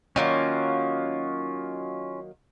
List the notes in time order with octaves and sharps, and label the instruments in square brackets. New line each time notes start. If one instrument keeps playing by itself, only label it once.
[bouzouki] D#3 F#3 A#3 [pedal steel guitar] C#4 F4